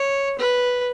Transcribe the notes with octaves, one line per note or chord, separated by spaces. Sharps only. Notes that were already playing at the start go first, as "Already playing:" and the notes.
Already playing: C#5
B4